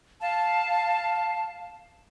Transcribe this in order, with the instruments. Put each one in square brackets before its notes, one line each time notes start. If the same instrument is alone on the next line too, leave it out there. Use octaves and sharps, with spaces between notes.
[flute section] F5 A5